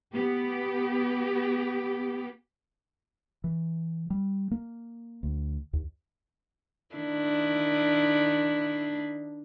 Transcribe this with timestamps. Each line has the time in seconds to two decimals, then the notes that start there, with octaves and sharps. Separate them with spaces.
0.12 B3 G4
3.44 E3
4.10 G3
4.51 A#3
5.23 D2
5.73 D#2
6.95 D#3 D4 E4